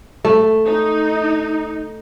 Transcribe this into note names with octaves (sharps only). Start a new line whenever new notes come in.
A3
D#4